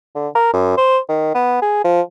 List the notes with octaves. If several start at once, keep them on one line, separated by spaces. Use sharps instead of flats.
D3
A#4
F#2
C5
D#3
B3
G#4
F3